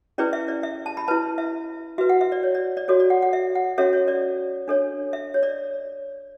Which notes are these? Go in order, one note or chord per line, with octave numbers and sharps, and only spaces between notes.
C#4 E4 G#4 B4 D5
E5
D5
E5
A5
B5
E4 B4 A5
E5
F#4 B4 E5
F#5
E5
D5
C#5
D5
D5
F#4 A4 C#5
D5
F#5
F#5
E5
F#5
C#4 F#4 A4 C#5 E5
C#5
D5
D4 A4 C#5
E5
C#5
D5